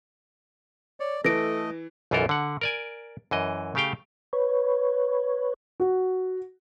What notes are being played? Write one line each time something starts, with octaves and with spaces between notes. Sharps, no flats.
C#5 D5
E3 A3 A4 D#5 A#6 D7
B1 F#2 E3 F4 A4 A#4
D3 F#5
A#4 D5 G#5
F#2 E3 D#5
C#3 A3 G4 F5 G5
B4 C#5
F#4